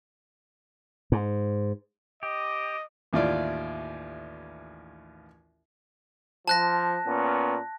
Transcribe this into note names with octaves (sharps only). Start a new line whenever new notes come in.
G#2
G4 D#5
A1 D#2 E4 F4 D5
F3 A5 F#6 A#6
A#2 B3 C#4